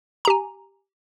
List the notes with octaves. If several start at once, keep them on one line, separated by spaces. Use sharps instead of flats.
G4 G#5 A#5